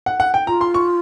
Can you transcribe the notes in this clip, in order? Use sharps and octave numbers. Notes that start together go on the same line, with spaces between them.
F#5
F#5
G5
F4 A#5
C6
C#6